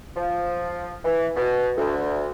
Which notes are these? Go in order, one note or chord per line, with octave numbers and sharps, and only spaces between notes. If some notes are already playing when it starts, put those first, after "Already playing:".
F3
E3
B2
D2